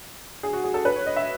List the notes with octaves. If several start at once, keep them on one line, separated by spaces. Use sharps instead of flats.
G#4
F#4
G#4
A4
B4
C#5
D#5
E5